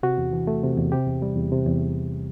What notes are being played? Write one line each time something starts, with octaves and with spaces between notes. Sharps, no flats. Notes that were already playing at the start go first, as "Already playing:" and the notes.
C3 F#4
E2
E3
A3
C3
E2
C3 G4
E2
G3
E2
C3
E2